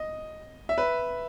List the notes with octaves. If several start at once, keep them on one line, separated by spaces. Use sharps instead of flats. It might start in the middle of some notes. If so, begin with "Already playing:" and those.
Already playing: D#5
E5
B4